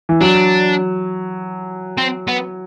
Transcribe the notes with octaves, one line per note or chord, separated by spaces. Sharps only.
E3
F#3 D4
C4
B3